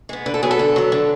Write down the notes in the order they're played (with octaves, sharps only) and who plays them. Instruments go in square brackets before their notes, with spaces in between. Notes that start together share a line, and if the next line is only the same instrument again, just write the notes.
[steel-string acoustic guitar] G#3 B3
D3 B4
A4
F#3 B3 G#4
A4
D3
F#3 B3
D3